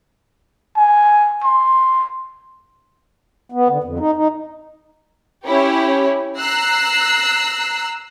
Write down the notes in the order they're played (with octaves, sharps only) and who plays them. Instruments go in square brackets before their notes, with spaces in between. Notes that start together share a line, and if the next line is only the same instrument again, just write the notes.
[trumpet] G#5
C6
[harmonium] B3
D3
F2
D#4
D#4
[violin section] C#4 E4 G4 C#5
A#5 E6 F#6 C7